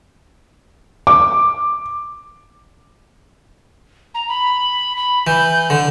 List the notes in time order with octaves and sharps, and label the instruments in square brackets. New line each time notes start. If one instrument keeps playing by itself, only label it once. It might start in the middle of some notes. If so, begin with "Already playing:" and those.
[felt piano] D6
[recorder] A#5
B5
B5
[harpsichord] E3 [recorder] G6
[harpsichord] D3